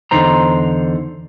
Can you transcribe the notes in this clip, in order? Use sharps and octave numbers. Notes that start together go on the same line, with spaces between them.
E2 D3 D#4 C5 A#5